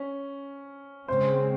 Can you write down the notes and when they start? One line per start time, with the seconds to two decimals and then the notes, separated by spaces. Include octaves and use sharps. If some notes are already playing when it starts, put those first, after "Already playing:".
Already playing: C#4
1.08 C#3 G#3 C4 C5